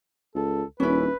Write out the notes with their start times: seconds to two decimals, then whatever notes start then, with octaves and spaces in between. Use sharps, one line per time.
0.35 C#2 A4
0.80 D#1 C#4 E4 B4